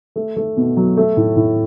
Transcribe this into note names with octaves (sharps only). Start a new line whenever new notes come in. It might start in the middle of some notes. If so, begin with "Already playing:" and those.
A3
A3
B2
F#3
A3
A2
A2